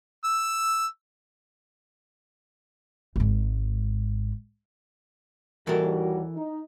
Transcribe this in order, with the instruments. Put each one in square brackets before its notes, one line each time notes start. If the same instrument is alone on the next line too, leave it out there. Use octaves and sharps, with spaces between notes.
[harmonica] E6
[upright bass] G#1 G#2
[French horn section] D#2 G3 F#4 [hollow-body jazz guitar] E3 A4 A#4
[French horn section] D#4